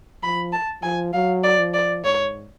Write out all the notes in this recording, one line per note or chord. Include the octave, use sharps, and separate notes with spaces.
F3 B5
A5
F3 G#5
F#3 F5
D5
F3
D5
G#2 C#5